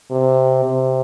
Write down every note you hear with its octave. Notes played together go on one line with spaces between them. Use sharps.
C3
C3